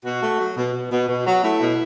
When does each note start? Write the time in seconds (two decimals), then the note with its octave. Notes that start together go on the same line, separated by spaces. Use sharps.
0.04 B2 F#4
0.21 A3
0.39 F#3
0.56 B2
0.74 B2
0.90 B2
1.08 B2
1.25 F#3
1.42 A3 E4
1.60 B2